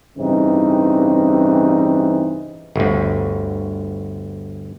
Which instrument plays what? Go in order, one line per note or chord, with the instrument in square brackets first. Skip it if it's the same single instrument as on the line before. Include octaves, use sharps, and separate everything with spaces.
[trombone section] A1 G2 C#3 E3 C4 D#4
[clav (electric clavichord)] G1 D2